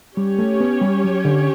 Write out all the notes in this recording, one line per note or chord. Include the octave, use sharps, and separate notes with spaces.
G3 C#4 G4 C#5
A3
B3
G3
F#3
D3